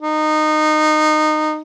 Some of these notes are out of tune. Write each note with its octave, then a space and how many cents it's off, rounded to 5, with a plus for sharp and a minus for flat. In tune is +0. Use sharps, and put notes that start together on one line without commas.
D#4 -20